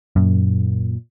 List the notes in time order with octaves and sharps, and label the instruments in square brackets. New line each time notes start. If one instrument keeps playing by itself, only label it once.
[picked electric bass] F#2 [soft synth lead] A#2